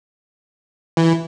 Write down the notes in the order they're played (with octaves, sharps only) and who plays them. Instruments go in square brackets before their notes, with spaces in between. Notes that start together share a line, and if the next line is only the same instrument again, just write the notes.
[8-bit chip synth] E3